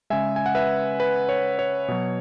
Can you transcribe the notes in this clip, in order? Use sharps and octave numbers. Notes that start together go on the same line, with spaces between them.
C#3 G#3 E5 G#5
G#5
F#5
B4 E5
B4
C#5
C#5
B2 F#3